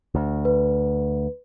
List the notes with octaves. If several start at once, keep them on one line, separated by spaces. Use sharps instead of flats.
D2
B4